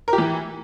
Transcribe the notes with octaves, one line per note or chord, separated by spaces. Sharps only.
A#4
G4
E3